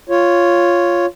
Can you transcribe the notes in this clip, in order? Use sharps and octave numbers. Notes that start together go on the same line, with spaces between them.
F4 C#5